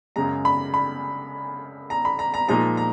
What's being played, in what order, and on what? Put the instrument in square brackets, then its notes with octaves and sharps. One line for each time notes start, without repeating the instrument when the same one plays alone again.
[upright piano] F#2 C#3 G#3 A#5
B5
B5
A#5
B5
A#5
A#5
A#2 F3 G#3 D#4 A#5
A#5